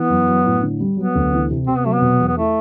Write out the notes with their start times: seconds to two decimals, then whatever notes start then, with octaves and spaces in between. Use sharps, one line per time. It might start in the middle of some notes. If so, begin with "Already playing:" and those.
Already playing: E3 B3
0.10 F#2
0.28 F#3
0.46 A2
0.62 D3
0.80 G3
0.97 F#3 B3
1.15 D2
1.32 E3
1.50 C3
1.67 C3 C4
1.77 B3
1.85 F#3 A3
1.94 B3
2.02 B2
2.20 E2
2.27 B3
2.37 A3 E4